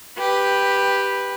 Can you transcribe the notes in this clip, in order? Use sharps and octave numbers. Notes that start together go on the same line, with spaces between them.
G4 B4